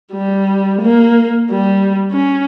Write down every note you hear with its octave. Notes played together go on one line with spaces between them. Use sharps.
G3
A#3
G3
C#4